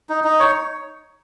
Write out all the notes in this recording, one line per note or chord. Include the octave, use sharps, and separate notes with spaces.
D#4
D#4
C#5